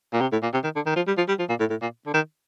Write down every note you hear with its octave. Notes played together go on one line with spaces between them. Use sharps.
A#2
C3
A2
A#2
C3
D#3
D3
D#3
F3
G3
F3
G3
F3
A#2
A2
A2
A#2
D3
D#3